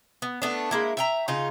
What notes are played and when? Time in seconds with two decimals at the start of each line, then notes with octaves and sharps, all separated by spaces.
0.22 B3
0.42 A3 B3 D4
0.71 G#3 A#3 E4
0.97 E5 G5 A#5
1.28 C#3 D#4 F4